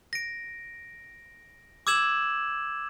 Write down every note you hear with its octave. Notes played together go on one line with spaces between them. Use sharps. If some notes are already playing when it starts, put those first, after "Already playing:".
A#6 D7
D6 E6 G#6 E7 F#7